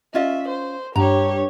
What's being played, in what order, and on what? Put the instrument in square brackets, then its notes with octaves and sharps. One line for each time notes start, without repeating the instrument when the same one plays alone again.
[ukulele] C#4 F4 D#5 [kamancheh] E5
[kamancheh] C5
[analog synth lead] G2 [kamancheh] G4 C#5 [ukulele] A#5